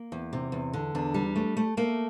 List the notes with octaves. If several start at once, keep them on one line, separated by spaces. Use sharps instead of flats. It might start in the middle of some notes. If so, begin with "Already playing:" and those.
Already playing: A#3
E2
C3
E2
D3
E2 D4
G3
A3
A3
A3 A#3